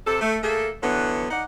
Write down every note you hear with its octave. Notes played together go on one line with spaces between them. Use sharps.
C3 A4
A3
A3 A#3 G#4 A4
D3 E3 F#3 B3
D#4 D5 F#5